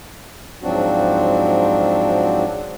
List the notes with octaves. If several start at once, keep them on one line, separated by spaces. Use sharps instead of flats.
G#2 F3 F#3 C4 D4 F#4